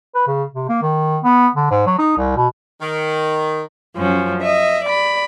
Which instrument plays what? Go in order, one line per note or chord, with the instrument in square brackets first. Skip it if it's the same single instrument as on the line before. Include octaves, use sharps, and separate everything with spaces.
[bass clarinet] B4
C#3
C3
A#3
D#3
B3
D3
G#2
F#3
D#4
C2
B2
[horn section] D#3
[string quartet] F#2 F3 C#4
D#5 E5
D5 B5